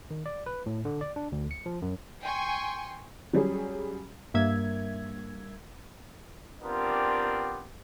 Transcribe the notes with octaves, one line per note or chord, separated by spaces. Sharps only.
D#3
D5
B4
A2
D3
D5
D4
D2
C#7
F3
F#2
G5 G#5 C6 C#6
F#3 G3 C#4 G#4
G2 A#3 E5 G#6
B3 C4 D4 F4 G4 A#4